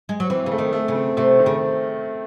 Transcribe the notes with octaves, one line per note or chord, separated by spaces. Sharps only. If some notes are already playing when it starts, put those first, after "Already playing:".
G#3
F#3
E3 C4
C#3
A3
D#3
A3
C#3
C4
C3 A3
D#3
C#3